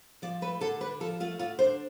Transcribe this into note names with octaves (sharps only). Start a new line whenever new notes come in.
F3 D5
A3 B4
D3 A4
D4 B4
F3 A4
A3 F4
D3 F4
D4 C5